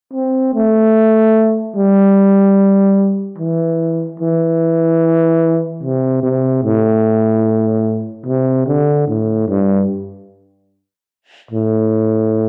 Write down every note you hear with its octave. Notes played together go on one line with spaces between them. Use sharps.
C4
A3
G3
E3
E3
C3
C3
A2
C3
D3
A2
G2
A2